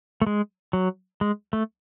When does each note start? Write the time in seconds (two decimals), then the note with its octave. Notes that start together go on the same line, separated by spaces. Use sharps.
0.22 A3
0.27 G#3
0.73 F#3
1.21 G#3
1.53 A3